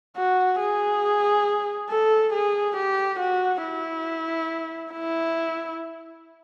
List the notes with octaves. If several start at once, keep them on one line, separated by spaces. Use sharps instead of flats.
F#4
G#4
A4
G#4
G4
F#4
E4
E4